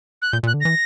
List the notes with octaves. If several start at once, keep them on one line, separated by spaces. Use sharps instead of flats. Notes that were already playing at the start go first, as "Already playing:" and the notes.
F#6
A#2 G6
A#2 F#6
D3
E3 A#6